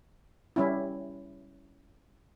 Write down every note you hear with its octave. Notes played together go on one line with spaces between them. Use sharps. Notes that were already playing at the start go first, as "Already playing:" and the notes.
G3 C#4 E4